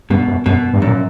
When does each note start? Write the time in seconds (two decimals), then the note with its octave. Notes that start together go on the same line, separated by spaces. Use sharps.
0.10 G2 B2
0.27 F#2
0.46 F#2 B2
0.73 G2
0.82 F#2
0.87 A#2